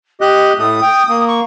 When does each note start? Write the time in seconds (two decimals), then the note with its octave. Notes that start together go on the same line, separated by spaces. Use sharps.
0.21 G4 D#5 F#6
0.58 A2 A3 D#6
0.82 G5
1.09 A#3
1.27 C#6